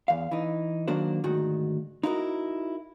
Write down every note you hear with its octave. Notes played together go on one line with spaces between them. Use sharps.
E2 F5
E3 D#4
D#3 F#3 A#3 D4 F#4 C5
D2 G#2 D#3 F#4
D#4 E4 F#4 A#4